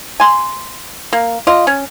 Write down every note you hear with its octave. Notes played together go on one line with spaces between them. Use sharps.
G#5 C6
A#3
F4 D#5
C#4